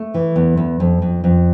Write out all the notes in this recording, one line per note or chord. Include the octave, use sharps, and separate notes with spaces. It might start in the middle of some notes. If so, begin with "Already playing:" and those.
Already playing: A3
E3
E2
E2
F2
F2
F2